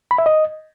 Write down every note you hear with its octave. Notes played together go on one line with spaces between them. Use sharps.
B5
E5
D#5